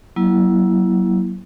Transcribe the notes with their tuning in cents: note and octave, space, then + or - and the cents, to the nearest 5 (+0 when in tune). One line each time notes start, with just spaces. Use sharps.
F#3 +15 A#3 +30 E4 +0